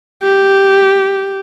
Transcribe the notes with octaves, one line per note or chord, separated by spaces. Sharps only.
G4